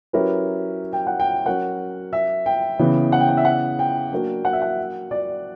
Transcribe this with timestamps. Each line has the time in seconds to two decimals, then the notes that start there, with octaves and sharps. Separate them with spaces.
0.13 F#3 C#4 E4 G4 A#4 B4
0.93 G5
1.07 F#5
1.20 G5
1.46 F#3 C#4 F#4 A#4 F#5
2.13 E5
2.46 G5
2.79 C#3 E3 B3
3.12 F#5
3.20 G5
3.29 F#5
3.37 E5
3.45 F#5
3.79 G5
4.12 F#3 A#3 D4 F#4 A#4
4.45 F#5
4.53 E5
4.62 F#5
5.11 D5